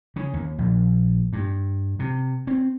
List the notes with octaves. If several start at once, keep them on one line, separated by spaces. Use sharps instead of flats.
C#3
D#2
A#1
G2
C3
C4